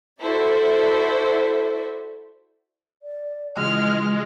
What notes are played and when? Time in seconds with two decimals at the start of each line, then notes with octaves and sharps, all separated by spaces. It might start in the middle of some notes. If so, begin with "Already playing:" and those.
0.21 E4 F#4 A4 C5 D5 E5
3.02 D5
3.57 C#3 E3 F3 G#3 F#4 F6